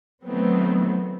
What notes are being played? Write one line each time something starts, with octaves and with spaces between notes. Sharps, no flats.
D#3 E3 F#3 A3 B3 C4